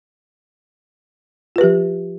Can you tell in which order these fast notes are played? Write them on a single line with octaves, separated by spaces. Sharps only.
F4 B4 G4 F3